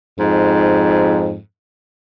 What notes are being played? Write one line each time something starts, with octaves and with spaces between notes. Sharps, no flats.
F2 G#2